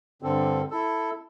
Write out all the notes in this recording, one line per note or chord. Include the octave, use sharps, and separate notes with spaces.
G2 D3 C4 A4
E4 A4